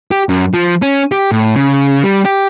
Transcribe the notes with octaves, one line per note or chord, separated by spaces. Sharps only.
G4
F#2
F3
C#4
G4
A2
C#3
G3
G4